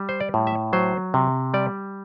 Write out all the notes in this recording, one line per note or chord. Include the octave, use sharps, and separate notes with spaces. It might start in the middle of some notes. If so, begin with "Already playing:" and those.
Already playing: G3
C5
D5
A2
E5
F#3 C5
C3
G3 D5